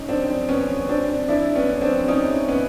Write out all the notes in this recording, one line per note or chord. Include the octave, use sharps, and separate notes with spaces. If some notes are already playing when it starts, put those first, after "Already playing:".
Already playing: C#4 D#4
C4 D4
B3 C#4
C4 D4
D4 E4
B3 C#4
C4 D4
C#4 D#4
B3 C#4